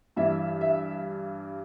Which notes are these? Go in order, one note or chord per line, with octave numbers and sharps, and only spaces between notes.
G2 E3 E5
E5